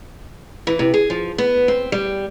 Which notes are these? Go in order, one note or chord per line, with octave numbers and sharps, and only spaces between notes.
E3
C3
G#4
F3
B3
C4
G3